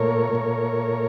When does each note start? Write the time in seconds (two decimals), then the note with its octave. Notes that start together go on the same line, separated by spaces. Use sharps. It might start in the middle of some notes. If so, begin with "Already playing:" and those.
Already playing: A#2 A3 A#4 C#5
0.33 A#2 A3